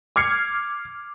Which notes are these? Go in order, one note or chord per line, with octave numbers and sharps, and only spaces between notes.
D6 F6 G#6 C7 C#7